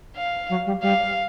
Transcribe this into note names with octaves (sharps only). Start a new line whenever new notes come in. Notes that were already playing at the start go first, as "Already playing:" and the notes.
F5
F#3
G3
G3 F5